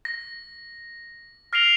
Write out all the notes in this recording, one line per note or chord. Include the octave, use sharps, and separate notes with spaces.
A#6
F6 A#6 C7 D7 F7 G7